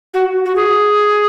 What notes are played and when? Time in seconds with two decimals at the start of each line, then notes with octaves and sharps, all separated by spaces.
0.14 F#4
0.45 F#4
0.56 G#4